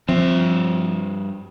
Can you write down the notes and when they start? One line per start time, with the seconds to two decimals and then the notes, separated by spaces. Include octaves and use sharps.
0.09 G2 F3 C4 E5